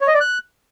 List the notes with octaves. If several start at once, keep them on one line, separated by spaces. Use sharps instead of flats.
C#5
D#5
D5
F#6